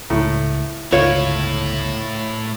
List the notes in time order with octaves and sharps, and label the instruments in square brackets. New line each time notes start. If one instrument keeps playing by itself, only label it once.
[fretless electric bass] C#2 [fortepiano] A2
[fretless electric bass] G1 C#2 [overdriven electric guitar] A2 E4 [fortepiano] F4 [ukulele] C#5